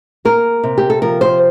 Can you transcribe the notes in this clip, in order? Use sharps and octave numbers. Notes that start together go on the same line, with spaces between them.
A#3 A#4
C3
G4
A4
F3 A#4
C5